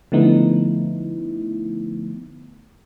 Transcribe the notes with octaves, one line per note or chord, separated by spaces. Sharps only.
D3 F3 A3 B3 D#4 E4